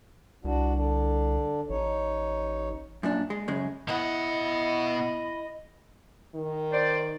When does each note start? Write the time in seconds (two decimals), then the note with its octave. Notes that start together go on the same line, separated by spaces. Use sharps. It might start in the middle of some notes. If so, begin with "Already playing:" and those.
0.44 C2 D4 F#4
0.75 D3 D4
1.70 A1 D#4 C#5
3.03 F#2 A#2 D4
3.30 G#3
3.48 F#2 C#3 G#3
3.88 B2 E4 D#5 F#5 B5
6.35 D#3
6.72 C5 D5